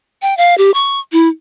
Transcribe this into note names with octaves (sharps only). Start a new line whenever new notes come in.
G5
F5
G4
C#6
E4